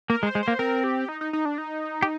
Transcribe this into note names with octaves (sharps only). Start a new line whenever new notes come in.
A#3 A#4
G#3
C5
G#3
A#3 C5
C4 A#4
G4
D#4
D#4
D#4
D4
D#4
G4